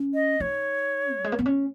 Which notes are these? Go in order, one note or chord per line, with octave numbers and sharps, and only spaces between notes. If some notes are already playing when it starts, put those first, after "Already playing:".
Already playing: C#4
D#5
D#4 C#5
F#3
G#3
A#3
B3
C#4